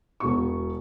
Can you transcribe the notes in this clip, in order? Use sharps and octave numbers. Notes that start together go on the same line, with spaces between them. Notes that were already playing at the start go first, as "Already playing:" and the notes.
E1 B2 C#6